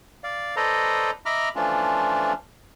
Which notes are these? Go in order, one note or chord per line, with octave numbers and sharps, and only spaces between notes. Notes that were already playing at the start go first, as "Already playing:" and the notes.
D5 F5
A4 B4 C5 D5 D#5 A#5
D#5 E5 A#5 B5 D6 F6
E3 F3 A3 C#4 D4 F4